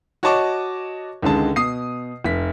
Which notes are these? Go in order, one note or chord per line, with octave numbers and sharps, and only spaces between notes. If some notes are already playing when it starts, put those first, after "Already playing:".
F#4 C#5 D#5 A5 C#6 D6
C#2 D3 D#3 G#3 A5
B2 D#6 C7
F1 B6